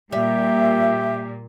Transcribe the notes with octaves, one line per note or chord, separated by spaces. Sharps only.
A#2 G3 G4 E5